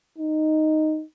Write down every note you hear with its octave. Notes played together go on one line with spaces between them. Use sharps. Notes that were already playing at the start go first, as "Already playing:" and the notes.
D#4